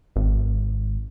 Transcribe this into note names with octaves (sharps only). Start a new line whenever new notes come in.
G#1